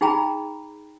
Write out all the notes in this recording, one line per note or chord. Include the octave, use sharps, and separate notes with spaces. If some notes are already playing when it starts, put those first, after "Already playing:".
D#4 G#4 G5 A#5 B5